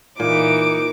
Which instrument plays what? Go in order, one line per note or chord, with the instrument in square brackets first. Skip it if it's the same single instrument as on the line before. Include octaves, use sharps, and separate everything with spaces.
[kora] A#2 [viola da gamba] E3 D#4 [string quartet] D6